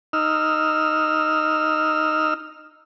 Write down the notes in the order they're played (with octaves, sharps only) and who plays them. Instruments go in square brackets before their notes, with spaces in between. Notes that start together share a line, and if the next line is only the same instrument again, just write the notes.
[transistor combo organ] D#4 E6 F6